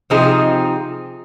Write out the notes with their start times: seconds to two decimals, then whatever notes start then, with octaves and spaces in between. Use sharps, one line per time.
0.10 C3 F3 C4 D#4 G#4